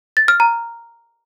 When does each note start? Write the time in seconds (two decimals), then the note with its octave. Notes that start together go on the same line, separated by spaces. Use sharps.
0.17 A6
0.28 F6
0.40 A#5